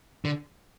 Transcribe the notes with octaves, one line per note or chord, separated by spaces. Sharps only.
D3